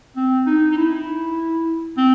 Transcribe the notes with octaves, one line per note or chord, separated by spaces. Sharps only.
C4
D#4
D#4
E4
C4